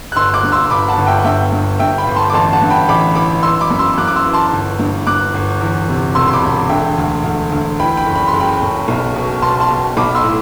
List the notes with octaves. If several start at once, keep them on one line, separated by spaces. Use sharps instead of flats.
F#6
G1 C6 E6
D6 F#6
G2
C6 E6
G1 B5 D6
F#5 A5
G1
E5 G5
F#5
G2 E5 G5
G2
G2 E5 G5
G5 B5
G1
A5 C6
D6
A1 A5 C6
F#5 A5
G2
G5 B5
A1 B5 D6
E3 B5 D6
E3 C6 E6
B5 D6
F#2
C6 E6
F#2 D6 F#6
D6
C6 E6
E3
A5 C6
G1
G2
G2 D6 F#6
G1
E2
C3
E1 C6 E6
C6
B5 D6
E1
D3 E5 G5
D2
D2
D2
E3 G5 B5
G5 B5
F#1
B5
C6
F#1
G5 B5
F#1
B1
B2
B2 A5 C6
A5 C6
B2
B1 B5 D6
C6 E6
A2